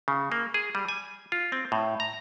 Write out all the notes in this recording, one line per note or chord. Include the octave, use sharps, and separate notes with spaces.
C#3
A#3
G#4
G3
G#5
F4
C4
A2
A#5